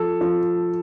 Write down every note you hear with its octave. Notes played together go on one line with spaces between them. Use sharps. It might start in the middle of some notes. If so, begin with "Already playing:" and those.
Already playing: F3 A4
F3